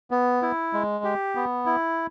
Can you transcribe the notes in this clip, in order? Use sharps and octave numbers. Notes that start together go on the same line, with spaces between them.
B3
E4
G#3
G4
B3
E4